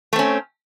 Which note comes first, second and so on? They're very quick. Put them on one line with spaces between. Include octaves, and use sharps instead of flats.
A3 C4 C#4